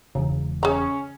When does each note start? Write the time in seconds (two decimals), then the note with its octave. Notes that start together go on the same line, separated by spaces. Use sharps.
0.15 E1 E2 C#3
0.63 C#4 G#4 A#5